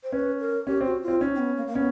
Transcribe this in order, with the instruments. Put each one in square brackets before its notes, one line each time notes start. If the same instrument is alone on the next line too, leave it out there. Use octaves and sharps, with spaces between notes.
[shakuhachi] C5
[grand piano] C#4 [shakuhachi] B4
[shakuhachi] A#4
[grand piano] C#4 [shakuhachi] G4
[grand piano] C4 [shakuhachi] F#4
[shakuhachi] F4
[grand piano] C4
[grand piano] C#4 [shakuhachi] D#4
[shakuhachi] C4
B3
A#3
A#3
[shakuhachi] B3 [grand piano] C#4